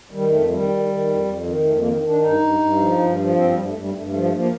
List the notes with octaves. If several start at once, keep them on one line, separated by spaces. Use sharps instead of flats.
D#3 G3
F2 A3
D#3 G3
D#3
D#3
F2
F2
D#3
F2 A3
A#3
D#3
D#3
D4
G2 D#4
G2
G2
F3
G2
F3
G2 C4
G2 G3
A3
G2
G3
G2 A3
A3
F3
A3
F3 A#3